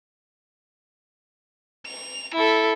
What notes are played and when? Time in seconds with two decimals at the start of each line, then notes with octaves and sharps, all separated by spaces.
1.86 F7
2.34 E4 A4